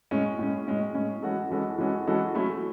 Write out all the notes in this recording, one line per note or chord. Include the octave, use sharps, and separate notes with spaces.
A2 G#3 C#4
A2 G#3 C#4
A2 G#3 C#4
A2 G#3 C#4
E3 G#3 C#4 F#4 A4
E3 G#3 C#4 F#4 A4
E3 G#3 C#4 F#4 A4
E3 G#3 C#4 F#4 A4
F#3 A3 C#4 E4